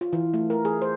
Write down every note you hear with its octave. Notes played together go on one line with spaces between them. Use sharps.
F4
E3
A3
A#4
G#4
C5